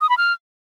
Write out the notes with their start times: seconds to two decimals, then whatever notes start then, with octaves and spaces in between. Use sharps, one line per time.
0.01 D#6
0.09 B5
0.18 F6